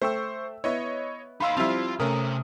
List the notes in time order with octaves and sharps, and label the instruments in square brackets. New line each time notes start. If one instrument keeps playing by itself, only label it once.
[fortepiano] A3 G5 [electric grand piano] C5 C#6 E6
[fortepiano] B3 E4 [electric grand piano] C#5 D#5 C#6
[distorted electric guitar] D#4 F5 [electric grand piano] B5 C6 E6
[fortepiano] F3 G3 E5 [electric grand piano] C4 E4 [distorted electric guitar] F4
[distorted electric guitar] C3 A#5 [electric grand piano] A3 C#4 D#6 [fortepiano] A#4